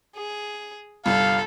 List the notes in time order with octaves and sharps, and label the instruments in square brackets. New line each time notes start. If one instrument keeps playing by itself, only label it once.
[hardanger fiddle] G#4
[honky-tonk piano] G1 C2 [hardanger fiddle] A4 [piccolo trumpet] F5